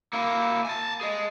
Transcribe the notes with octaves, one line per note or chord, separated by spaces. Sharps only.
A#3 E4
G#5 A5
G#4 D#5